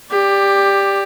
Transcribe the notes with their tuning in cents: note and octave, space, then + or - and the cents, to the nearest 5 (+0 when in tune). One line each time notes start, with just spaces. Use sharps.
G4 +15 D5 +0